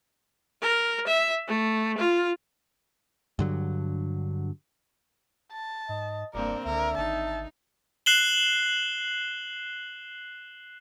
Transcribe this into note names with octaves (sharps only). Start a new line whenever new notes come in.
A#4
E5
A3
F4
G2 D3 F#3
A5
G#2 D#5
F1 G2 A#3 C4 A#4 D5
C#2 D3 A#4 E5
G#1 D#4 A5
F#6 C7 E7 F#7 G7